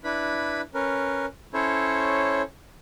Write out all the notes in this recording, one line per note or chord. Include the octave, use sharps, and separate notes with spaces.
D4 E4 B4 B5
C#4 A#4 B4
C#4 E4 A4 C5 C#5